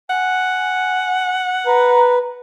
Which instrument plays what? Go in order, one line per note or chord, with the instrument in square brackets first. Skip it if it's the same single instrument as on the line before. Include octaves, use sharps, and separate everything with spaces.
[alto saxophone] F#5 [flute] G#5
[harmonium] B4 [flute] A#5